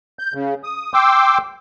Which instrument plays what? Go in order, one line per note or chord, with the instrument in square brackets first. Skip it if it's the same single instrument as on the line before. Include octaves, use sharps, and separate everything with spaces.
[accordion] G6
C#3
D#6
G5 C6 D6 E6